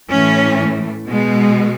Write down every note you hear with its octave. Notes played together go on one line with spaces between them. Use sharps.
A2 E3 A3 C#4
B2 G#3